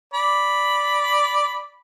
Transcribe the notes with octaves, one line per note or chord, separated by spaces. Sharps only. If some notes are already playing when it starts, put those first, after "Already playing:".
D5 B5